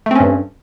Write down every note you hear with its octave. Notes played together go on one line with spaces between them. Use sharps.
G2 A3 C4 C#4